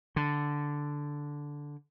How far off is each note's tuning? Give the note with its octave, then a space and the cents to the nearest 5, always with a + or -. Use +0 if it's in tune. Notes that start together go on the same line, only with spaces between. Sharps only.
D3 -5